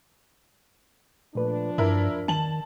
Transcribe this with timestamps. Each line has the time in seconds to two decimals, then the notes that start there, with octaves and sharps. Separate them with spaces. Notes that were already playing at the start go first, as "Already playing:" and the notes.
1.35 A#2 F3 A3 D4 B4
1.78 E2 G2 E4 A#4
2.28 D#3 A5 F#7